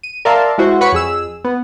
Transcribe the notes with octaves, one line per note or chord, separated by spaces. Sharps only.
D#7
A#4 D5 E5 F5 A5 C6
G#3 E4 F#4 C5
B4 C#5 F#5 B5 C#6
F2 G#4 E6
B3